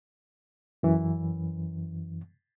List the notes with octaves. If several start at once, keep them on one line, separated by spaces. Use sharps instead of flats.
F#2 E3